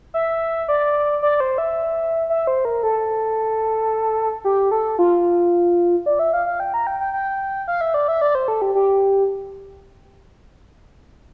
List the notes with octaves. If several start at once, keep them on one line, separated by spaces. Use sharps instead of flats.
E5
D5
D5
C5
E5
E5
C5
A#4
A4
G4
A4
F4
D5
E5
F5
F5
G5
A#5
G5
G5
G5
F5
E5
D5
E5
D5
C5
A4
G4
G4